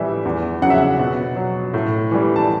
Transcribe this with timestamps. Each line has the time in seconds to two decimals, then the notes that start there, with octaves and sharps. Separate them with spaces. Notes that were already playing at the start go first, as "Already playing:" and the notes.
Already playing: A2 E3 G3 E5
0.25 E2
0.62 C#3 F#3 F#5
0.70 E5
0.78 F#5
0.99 B2
1.36 F#3
1.74 A2
2.11 E3 G3
2.36 A5